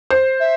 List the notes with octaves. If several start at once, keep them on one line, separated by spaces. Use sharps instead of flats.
C5
E5